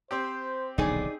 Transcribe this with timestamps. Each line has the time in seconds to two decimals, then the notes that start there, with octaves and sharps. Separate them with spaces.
0.11 C4 G4 C5
0.78 D#1 B1 D3 D#4 G#4 D5